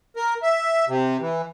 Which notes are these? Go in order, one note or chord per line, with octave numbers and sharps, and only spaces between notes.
A#4
E5
C3
E3